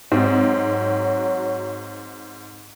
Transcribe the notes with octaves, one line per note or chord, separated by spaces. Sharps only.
G#2 F#3 C4